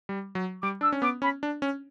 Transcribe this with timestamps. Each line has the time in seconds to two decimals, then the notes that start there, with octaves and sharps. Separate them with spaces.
0.09 G3
0.35 F#3
0.62 G3 D6
0.81 D4 E6
0.92 C#4
1.02 B3 D6
1.22 C#4 B5
1.43 D4
1.62 C#4